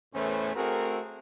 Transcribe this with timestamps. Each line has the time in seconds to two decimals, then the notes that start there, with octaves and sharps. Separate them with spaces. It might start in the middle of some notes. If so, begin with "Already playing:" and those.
0.14 E2 A2 A3 C#4 B4 C5
0.55 A3 C4 F#4 G#4 A#4